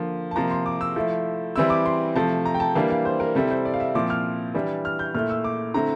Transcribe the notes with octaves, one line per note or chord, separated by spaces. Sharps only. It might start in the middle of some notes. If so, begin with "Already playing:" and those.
Already playing: D3 F3 A#3
A5
C3 F3 A#3 A#5
C6
D6
E6
F3 A3 E4
E3 G3 C4 E4 E6
D6
C6
C3 F3 A3 A5
A#5
G5
A5
E3 G3 A#3 D4 F5
F5
C5
A#4
C3 G3 C4 E4 A4
C5
D5
F5
E5
A#2 F3 C4 E4 D6
F6
E3 G3 D4
F6
G6
A#2 A3 E4 F6
E6
D6
D3 A3 C4 E4 A#5